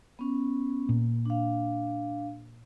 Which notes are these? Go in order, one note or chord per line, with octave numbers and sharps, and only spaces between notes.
B3 C#4
A#2
D4 F5